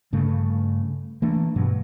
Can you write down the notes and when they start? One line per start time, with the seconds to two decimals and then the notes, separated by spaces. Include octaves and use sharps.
0.13 G2 C#3 A3
1.22 E3 A3 A#3 D4
1.56 G2 B2 F#3